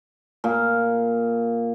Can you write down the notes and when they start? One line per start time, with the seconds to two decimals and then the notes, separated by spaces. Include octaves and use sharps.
0.44 A#2